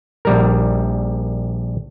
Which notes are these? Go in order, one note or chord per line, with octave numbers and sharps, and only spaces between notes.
A#1 G3 A#4